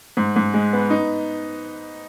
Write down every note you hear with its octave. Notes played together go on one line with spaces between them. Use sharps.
G#2
G#2
G#3
B3
D#4